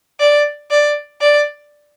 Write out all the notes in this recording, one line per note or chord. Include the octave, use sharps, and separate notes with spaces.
D5
D5
D5